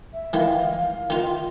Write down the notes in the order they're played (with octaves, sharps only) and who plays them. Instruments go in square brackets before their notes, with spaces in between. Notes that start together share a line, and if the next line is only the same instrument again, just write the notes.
[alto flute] E5
[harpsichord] D#3 E3 [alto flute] F5
[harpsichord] D#3 F4